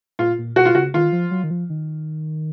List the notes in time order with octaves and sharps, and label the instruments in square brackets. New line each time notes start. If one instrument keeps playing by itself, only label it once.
[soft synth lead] A#2 [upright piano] F4
[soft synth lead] A#2
[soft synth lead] B2 [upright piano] F#4
[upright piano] F4
[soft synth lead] C#3 [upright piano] F#4
[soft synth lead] D#3 [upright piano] F4
[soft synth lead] F3
F#3
D#3
F3
D#3